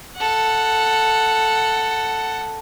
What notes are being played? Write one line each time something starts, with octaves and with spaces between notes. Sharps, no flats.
A4 F#5